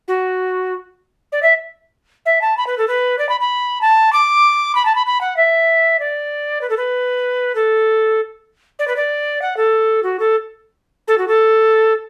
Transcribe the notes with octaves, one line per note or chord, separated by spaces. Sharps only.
F#4
D5
E5
E5
A5
B5
B4
A4
B4
D5
B5
B5
A5
D6
B5
A5
B5
B5
F#5
E5
D5
B4
A4
B4
A4
D5
B4
D5
F#5
A4
F#4
A4
A4
F#4
A4